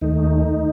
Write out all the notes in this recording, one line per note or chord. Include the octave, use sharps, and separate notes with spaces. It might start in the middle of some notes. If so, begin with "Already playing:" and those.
D#2 D#3 A3 D#4